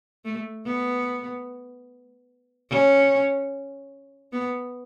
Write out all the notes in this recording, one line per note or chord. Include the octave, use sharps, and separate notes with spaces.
A3
B3
C#4
B3